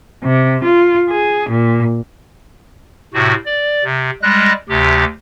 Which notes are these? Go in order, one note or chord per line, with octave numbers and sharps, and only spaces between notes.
C3
F4
G#4
A#2
A2 C3 F#4
D5
C3
G3 G#3 F#6 A#6
D2 C3 G4